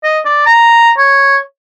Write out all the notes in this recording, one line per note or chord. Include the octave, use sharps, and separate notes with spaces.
D#5
D5
A#5
C#5